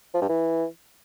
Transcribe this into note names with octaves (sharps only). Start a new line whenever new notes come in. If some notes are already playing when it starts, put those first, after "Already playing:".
F3
G2
E3